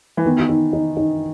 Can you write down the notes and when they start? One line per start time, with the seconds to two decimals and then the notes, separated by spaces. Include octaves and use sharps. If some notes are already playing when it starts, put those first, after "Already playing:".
0.17 E3
0.25 D#3 B3
0.49 D#4
0.73 D#4
0.97 D#4